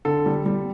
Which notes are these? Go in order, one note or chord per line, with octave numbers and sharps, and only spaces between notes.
D3 A4
G3
G3